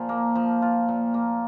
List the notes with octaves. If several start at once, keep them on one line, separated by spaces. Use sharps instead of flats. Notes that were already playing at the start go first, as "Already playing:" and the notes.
Already playing: A#2 F3 F4
A#3
F3
F4
A#2
A#3